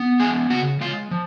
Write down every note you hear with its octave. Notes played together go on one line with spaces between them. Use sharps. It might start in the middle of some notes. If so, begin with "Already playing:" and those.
Already playing: B3
G#3 G#4 G#5
C#3 F#4 F#5
G#3 F4 F5
F3